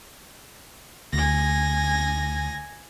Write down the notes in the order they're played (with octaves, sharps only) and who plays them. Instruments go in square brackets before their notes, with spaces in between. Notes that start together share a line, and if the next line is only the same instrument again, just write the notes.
[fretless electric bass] D2 [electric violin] G#5 A#6